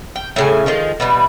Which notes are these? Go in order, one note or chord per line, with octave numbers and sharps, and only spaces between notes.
G5
A2 C#3 G#5
D#3 F3 G#3
B2 E3 F#3 G3